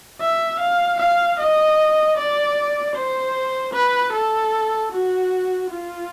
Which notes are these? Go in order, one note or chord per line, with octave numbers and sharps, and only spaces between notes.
E5
F5
F5
D#5
D5
C5
B4
A4
F#4
F4